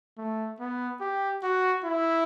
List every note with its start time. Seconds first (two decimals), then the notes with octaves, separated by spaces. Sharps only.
0.18 A3
0.60 B3
1.01 G4
1.43 F#4
1.85 E4